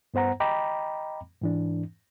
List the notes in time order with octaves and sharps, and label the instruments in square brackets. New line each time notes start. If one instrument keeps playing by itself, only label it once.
[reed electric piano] G2 B3 C5 F#5 A#5
D#5 G5 A#5 B5 D6
G#2 E3 D4